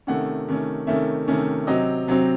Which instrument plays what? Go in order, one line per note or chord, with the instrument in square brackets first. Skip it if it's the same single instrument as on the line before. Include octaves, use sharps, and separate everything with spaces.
[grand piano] C3 D#3 A3 C#4 F#5
C3 D#3 A3 C#4
C3 D#3 A3 C#4 E5
C3 D#3 A3 C#4
C3 F#3 C4 D#5
C3 F#3 C4